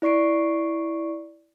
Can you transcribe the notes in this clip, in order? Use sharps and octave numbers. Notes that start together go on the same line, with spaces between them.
E4 D5 C#6 C7 D7